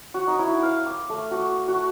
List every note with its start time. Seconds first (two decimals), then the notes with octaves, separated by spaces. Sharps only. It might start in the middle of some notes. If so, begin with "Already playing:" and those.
0.14 F#4
0.27 D#4
0.39 E4
0.63 F5
0.86 D6
1.10 A3
1.31 F#4
1.68 F#4